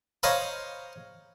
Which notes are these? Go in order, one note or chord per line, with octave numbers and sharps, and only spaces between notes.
C5 C#5 D#5 F5 A#5 B5